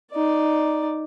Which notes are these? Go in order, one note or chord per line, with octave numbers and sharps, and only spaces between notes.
D#4 D5